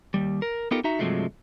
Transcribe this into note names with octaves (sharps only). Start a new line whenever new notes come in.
D#2 G3
A#4
B3 D#4 F4 G4 A4 A#4
D#4 F#4 E5 A#5
G2 C3 F3 F#3 G#3 A3